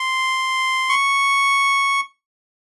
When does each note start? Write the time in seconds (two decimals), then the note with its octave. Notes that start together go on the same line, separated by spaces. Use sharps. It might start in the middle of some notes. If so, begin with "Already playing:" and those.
Already playing: C6
0.89 C#6